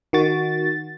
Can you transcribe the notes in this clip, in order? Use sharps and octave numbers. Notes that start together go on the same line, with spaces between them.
D#3 F#4 A6